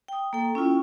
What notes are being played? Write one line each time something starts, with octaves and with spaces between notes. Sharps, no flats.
G5 D#6
A#3 A4 G5
C#4 E4 F4 G5